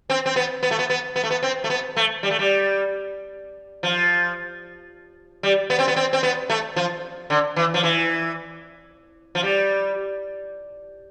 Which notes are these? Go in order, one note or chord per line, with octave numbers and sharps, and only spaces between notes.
C4
C4
B3
B3
A3
B3
B3
B3
A3
B3
C4
A3
B3
A3
G3
A3
G3
F3
G3
B3
C4
B3
C4
C4
B3
A3
F3
D3
E3
F3
E3
F3
G3